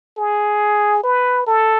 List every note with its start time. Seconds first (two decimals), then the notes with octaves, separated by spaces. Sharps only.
0.17 G#4
1.03 B4
1.47 A4